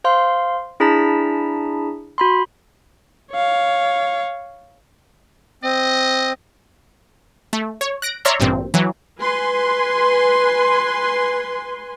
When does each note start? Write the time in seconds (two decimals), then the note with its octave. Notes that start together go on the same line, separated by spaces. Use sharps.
0.04 C5 F5 C6
0.80 D4 E4 G#4 A5 A#5 B6
2.18 F#4 B5 C6
3.32 C#5 F5
5.63 C4 D#5
7.53 A3
7.81 C#5
8.02 F#6 A#6 D7
8.25 C#5 D5 E5 A#5 C6 F6
8.40 A1 G2 A#2 C4
8.74 E3 F#3
9.20 B4 G#5 C6